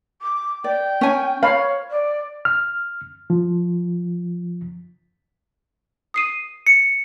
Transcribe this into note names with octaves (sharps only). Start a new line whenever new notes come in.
D6
D5 G5
C#4 G#5
C5 C#5 F5 B5
D5
F6
F3
D#6 C7 D#7
C#7